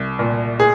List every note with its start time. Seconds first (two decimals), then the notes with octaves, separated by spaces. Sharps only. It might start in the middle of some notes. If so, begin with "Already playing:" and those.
Already playing: C2
0.19 A#2
0.60 G#4